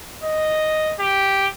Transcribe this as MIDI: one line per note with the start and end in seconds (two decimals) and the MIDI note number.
0.23 0.94 75
1.00 1.46 67